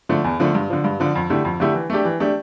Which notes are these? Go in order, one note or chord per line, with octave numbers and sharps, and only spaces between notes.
D3 F3 A3
E2
D3 F3 A3
G2
D3 F3
G2
D3 F3
F2
D3 A3 E4 G4
F2
D3 A3 E4 G4
E3
A3 D4 G4
E3
A3 D4 G4